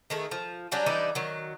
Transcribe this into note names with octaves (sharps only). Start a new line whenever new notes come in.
D#3 A3 G#4
F3
F#3 G3 C#4 D4
E3 G3 D4 D#4
D#3 F#3